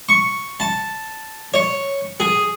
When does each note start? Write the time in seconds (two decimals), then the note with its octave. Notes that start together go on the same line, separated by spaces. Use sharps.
0.09 C#6
0.60 A5
1.54 C#5
2.20 G#4